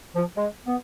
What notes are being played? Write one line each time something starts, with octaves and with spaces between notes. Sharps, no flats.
F3
G#3
B3